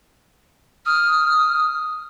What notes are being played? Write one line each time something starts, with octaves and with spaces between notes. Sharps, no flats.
D#6 F6